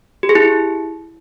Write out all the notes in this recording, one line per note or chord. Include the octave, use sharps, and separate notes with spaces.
G4
G#4
E4